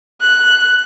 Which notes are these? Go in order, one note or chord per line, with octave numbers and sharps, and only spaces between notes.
F#6